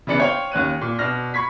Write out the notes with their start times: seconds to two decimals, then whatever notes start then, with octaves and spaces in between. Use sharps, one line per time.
0.07 C#3 E3 B3 D4 G#5 C#7
0.19 C5 C#5 F5 G5 C#6
0.52 D#2 C#4 F#6 D#7
0.81 A#2
0.99 B2 D4 F6 A#6
1.34 B5 C#6 G#6 B6